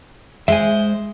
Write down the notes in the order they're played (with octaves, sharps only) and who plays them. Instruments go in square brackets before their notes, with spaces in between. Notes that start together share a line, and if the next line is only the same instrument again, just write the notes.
[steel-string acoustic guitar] G#3 C5 [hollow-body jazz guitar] E5 G#5